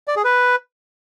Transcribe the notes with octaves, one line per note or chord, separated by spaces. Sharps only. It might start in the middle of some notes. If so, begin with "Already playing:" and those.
D5
G#4
B4